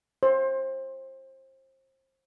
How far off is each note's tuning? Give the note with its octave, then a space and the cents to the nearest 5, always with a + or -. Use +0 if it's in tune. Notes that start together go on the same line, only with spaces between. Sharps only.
C5 +30